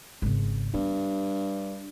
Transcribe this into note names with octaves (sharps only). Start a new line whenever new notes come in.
G#1 C#3
G2 B3